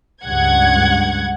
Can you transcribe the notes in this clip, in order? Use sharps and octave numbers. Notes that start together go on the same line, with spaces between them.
C#2 G2 F#5 G#6